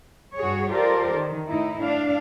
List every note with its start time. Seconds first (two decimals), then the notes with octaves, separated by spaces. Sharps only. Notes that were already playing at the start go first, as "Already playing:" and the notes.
0.36 G2 F#4 G#4 C#5
0.71 F4 G4 A4 A#4 C5 D5
1.11 D#3
1.48 A2 D#4 E4
1.81 D4 F5